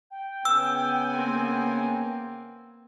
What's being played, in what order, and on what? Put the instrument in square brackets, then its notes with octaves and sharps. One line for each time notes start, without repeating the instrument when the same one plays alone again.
[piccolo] G5
[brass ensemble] C#3 B3 G#5 [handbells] E6
[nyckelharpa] A#3 C4